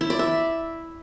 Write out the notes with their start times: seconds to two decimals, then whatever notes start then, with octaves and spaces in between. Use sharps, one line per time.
0.01 E4
0.10 D5
0.19 E5